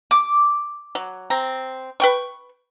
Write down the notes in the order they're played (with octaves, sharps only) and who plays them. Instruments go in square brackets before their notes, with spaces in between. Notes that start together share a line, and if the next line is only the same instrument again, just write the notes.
[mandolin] D6
[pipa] F#3
C4 A#5
B4 G5 C#6